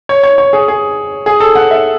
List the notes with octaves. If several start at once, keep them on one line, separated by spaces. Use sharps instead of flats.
C#5
C#5
C#5
G#4
G#4
G#4
A4
F#5
E5